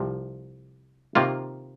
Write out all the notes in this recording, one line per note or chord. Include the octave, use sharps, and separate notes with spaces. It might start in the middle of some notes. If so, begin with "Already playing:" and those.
Already playing: C2 C3 F3
C3 D#3 A#3 F4